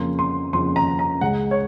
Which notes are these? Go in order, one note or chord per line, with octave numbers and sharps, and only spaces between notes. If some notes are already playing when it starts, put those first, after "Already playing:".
Already playing: F2 C#3 F3 A#3 C#4 C6
C6
F2 C#3 F3 A#3 C#4 C6
A#5
A#5
C#2 C#3 G#3 F#5
C#5